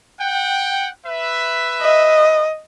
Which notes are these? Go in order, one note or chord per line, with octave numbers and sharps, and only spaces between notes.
F#5 G5
B4 E5
D#5